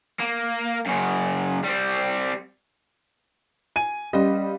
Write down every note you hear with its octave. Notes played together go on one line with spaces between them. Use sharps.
A#3
F#2 C#3
G3 C4
G#5 D#7
G3 C#4 D#5 F5